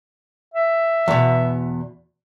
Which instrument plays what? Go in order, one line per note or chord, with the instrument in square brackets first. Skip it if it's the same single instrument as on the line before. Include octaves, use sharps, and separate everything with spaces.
[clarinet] E5
[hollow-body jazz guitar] E2 B2